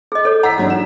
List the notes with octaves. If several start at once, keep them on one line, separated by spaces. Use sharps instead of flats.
G#4 D#5
A4 C#5
F#5 A#5 E6 B6
G#2 F#3 D4
E7